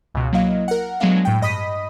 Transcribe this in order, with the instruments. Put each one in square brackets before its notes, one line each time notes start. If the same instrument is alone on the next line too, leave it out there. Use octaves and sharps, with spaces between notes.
[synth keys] C#2 B2
F#3 A#3 E4 D#5 F5
A#4 F#5
F#3 G#3 A3 B3 D4 F5
A2 G5
G2 D#5 B5 D#6 B6 D#7